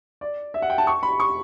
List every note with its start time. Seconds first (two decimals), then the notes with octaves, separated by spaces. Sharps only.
0.21 D5
0.54 E5
0.62 F#5
0.70 G5
0.78 A5
0.87 C#6
1.03 B5
1.20 C#6